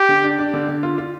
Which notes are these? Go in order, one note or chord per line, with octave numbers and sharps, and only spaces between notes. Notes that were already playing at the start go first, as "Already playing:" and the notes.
Already playing: G4
D3
D4
D4
D3
D3
F4
F4